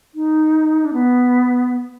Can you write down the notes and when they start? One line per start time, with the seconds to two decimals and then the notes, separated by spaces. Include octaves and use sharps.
0.15 D#4
0.85 D4
0.93 B3